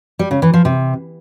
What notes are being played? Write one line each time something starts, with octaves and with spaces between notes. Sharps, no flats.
G3
C#3
E3
F3
C3